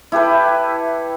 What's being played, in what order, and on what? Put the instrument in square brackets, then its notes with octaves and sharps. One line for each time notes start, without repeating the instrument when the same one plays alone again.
[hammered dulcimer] E4 G4 A4 B4